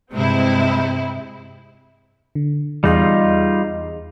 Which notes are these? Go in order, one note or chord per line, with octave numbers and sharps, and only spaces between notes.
G2 C3 G#3 C4 E4
D3
E2 G3 D#4 F4 G#4 D#5